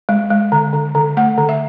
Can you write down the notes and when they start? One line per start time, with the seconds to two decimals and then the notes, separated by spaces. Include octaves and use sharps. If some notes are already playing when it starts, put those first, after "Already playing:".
0.09 G#3
0.30 G#3
0.52 D3
0.73 D3
0.95 D3
1.17 A3 F#5
1.38 D3
1.49 E5